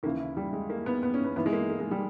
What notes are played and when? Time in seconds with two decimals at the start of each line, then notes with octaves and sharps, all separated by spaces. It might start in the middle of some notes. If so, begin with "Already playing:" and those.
0.03 D#2 C#3 E3 A#3
0.19 E4
0.37 G3
0.53 G#3
0.70 A#3
0.86 B3
1.03 B3
1.14 C#4
1.24 B3
1.36 G#2 E3 B3
1.46 G#3
1.53 A#3
1.70 A#3
1.80 G#3
1.91 G3